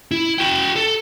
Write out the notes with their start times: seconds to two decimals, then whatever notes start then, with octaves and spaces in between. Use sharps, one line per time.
0.11 E4
0.38 F#4 G5
0.76 A4